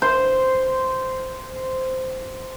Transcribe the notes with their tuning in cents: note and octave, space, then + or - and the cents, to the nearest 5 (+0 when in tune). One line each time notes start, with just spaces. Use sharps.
C5 -10